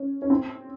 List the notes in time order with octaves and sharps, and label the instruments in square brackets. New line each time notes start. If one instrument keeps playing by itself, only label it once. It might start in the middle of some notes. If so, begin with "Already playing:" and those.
Already playing: [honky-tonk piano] C#4
C#4
C4